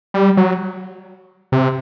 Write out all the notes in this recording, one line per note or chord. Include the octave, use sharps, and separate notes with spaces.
G3
F#3
C3